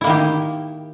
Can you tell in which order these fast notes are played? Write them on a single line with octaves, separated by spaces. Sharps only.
E4 A#3 D#3 G4